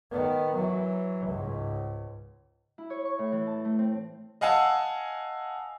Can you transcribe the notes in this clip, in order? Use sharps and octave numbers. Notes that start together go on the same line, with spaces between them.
D#3 B3
E3 F#3
C#2 G#2
E4
C#5
C#6
A2
E3
A5
A3
C4
D#5 F5 F#5 G#5 A5 E6